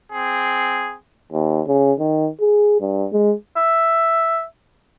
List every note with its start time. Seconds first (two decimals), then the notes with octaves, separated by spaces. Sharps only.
0.11 C4 G#4
1.32 D#2
1.67 C#3
1.99 D#3
2.40 G#4
2.80 G2
3.13 G#3
3.56 E5